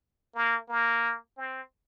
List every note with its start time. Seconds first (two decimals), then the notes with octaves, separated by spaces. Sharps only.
0.35 A#3
0.69 A#3
1.37 C4